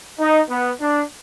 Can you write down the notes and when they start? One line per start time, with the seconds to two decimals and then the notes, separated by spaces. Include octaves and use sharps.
0.19 D#4
0.49 B3
0.80 D4